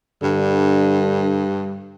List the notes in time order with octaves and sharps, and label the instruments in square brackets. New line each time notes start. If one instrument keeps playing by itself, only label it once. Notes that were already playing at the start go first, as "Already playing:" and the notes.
[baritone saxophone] G2 [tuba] D3